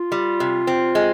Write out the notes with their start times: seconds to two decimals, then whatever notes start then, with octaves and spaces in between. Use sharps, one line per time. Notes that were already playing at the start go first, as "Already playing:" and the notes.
Already playing: F4
0.12 G3
0.40 C3
0.67 C4
0.95 G#3